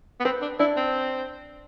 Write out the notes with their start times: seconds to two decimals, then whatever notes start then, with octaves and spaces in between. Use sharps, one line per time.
0.20 B3
0.25 C4 B4
0.42 D4
0.59 D4 E4
0.77 C4